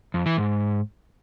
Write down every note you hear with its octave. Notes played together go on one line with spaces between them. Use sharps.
F2
E3
G#2